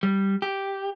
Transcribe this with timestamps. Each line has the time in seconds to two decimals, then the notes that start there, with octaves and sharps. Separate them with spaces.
0.03 G3
0.42 G4